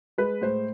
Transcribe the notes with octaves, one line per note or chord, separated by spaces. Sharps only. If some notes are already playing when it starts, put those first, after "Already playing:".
G#3 B4
A2 C5